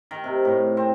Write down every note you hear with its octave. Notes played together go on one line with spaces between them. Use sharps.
D#3
C3
A2
C4